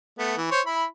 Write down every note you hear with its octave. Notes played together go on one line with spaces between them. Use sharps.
A3 B3
E3
C5 C#5
E4 B5